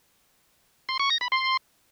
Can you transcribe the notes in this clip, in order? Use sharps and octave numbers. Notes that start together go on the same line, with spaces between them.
C6
C#6
A#6
B5
C6